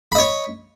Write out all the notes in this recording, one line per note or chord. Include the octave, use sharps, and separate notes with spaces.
C#5 D#5 B5